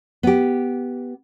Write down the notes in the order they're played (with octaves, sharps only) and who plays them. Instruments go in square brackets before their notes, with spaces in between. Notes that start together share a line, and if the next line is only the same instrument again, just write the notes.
[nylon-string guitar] B3 G4